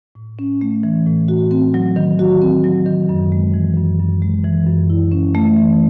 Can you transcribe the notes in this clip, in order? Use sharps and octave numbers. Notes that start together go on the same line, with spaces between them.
A2
C#4
A3
E3
A2
F#4
C4
F#3
D#3
F#4
C4
F#3
D#3
F#2
G#3
E3
F#2
F#2
G#3
E3
F#2
E4
C#4
A3
E3